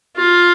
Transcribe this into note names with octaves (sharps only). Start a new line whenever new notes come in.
F4